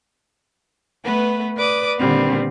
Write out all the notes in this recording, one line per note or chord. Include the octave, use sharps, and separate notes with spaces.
A3 B3 B4
B4 D5 D6 D#6
A#2 D3 D#3 G3 B3 C4